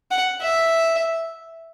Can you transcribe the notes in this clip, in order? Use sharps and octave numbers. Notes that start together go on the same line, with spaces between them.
F#5
E5